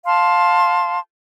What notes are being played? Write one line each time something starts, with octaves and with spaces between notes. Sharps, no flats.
F5 A5 C6